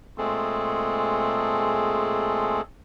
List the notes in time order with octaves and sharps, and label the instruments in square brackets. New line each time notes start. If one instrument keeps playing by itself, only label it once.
[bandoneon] A#2 G#3 A3 C4 G#4 A4